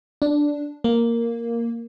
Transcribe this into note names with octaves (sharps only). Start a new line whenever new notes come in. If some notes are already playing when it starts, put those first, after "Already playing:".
D4
A#3